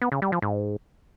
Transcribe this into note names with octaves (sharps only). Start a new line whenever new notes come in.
B3
C#3
G3
F3
G#2